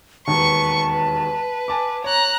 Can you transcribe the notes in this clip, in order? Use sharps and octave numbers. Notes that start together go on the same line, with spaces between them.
E1 D#2 D#3 B4 A5 C#6
B4
G#5 A5 D6
C#5 A#5 F#6